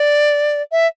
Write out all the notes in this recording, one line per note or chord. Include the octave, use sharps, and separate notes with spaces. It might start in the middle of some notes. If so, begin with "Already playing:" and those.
Already playing: D5
E5